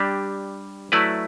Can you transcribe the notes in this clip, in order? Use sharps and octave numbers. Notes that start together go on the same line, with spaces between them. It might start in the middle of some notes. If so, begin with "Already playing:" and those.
Already playing: G3 D4 G4 D5
F#3 A3 E4 B4 D5